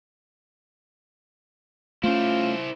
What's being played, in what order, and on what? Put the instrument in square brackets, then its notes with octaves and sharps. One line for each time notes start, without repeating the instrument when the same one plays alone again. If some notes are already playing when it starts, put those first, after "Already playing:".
[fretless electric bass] A3 C#4 [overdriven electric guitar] E4 C5 [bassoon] F4